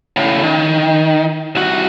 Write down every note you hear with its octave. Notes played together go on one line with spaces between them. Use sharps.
A2 C#3
D#3
C2 F#4